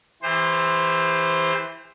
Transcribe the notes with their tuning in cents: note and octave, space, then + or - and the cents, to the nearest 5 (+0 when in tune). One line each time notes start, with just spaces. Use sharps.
E3 +0 G4 +45 C5 +0